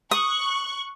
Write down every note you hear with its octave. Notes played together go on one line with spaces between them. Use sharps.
C#6 D#6 F#6